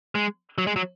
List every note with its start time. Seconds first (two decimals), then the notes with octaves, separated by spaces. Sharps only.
0.15 G#3
0.58 F#3
0.67 G#3
0.76 F#3